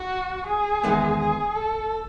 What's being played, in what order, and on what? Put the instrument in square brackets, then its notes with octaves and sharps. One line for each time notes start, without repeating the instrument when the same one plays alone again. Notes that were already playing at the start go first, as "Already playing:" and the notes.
Already playing: [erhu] F#4
G#4
[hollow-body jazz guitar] E2 D#3 G#3 B3
[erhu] G#4
A4